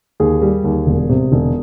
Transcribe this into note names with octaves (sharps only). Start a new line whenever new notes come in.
D#2 G#4
G3
D#2
E1
C3
E1